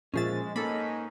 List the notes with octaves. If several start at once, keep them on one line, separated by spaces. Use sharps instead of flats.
A#2 F3 G#3 C#4 G#4 E5 A6
G#2 A#3 C#4 D#4 A4 B5